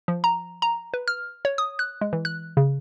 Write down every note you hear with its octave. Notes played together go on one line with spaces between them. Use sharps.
F3
A#5
A#5
B4
F6
C#5
D#6
F#6
G#3
E3
F#6
C#3